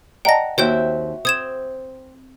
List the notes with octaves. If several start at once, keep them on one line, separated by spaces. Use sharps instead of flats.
D5 D#5 F#5 G5 A5 A#5 A#6
D#2 C4 F#4 C#5 E5 G5 G6
C4 D#6 G#6 E7